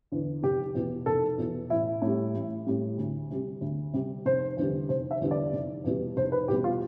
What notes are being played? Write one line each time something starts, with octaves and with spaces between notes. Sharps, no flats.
E2 D3
F1 G4
E2 B2
F1 A4
E2 B2
A1 E4
A2 G3
A1
A2 G3
D2
C3 G3
D2
C3 G3
F1 C5
E2 D3 G3
F1 C5
E5
E2 D3 G3
D5
F1
E2 B2 G3
F1 C5
B4
E2 B2 G3 G4
F4